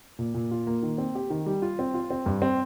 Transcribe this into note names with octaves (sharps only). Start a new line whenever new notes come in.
A#2
A#2
F4
A#3
D#3
C4
G4
D#3
G3
F4
C4
F4
C4
G2
C4